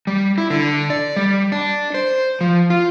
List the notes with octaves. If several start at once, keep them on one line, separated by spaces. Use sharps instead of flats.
G3
E4
D3
D5
G3
D4
C5
F3
F4